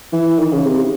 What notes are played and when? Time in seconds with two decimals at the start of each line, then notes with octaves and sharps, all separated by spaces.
0.13 E3
0.39 D#3
0.52 C#3
0.66 C3